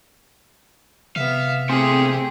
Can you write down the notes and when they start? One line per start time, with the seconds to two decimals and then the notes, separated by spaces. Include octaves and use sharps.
1.16 C3 B3 E5 F5
1.69 E2 A3 C4 G4 G#4